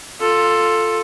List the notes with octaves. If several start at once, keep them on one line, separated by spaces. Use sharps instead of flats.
F4 A4